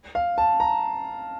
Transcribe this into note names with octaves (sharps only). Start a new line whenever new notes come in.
F5
A5
A#5